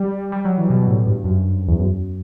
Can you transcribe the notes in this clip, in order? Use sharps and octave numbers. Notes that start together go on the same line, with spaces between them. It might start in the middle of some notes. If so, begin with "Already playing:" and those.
Already playing: G3
G3
F#3
E3
B2
A2
G2
F#2
E2
F#2